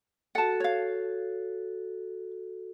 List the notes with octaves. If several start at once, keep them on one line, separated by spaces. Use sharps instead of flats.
F#4 A4 F#5 A5
C#5 F5